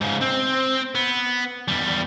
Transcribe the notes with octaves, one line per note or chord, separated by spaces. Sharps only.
G#2 C#3
C4
B3
E2 G3